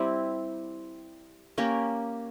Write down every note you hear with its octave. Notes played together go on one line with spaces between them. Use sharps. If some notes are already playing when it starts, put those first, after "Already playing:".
Already playing: G3 C4 E4
A#3 C#4 G4 A#4